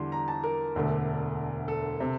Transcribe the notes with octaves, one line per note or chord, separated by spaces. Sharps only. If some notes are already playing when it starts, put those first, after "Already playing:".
Already playing: E2 D3 G3 C6
A#5
A5
A#4
E1 D2 D3 A3
A4
C3